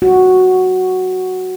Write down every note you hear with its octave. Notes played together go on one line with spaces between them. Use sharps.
F#4